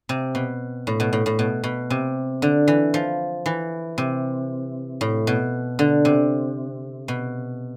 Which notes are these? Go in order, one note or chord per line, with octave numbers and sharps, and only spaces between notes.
C3
B2
A2
B2
A2
A2
B2
B2
C3
D3
E3
F3
E3
C3
A2
B2
D3
C3
B2